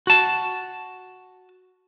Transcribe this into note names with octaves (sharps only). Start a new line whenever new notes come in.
F#4 A5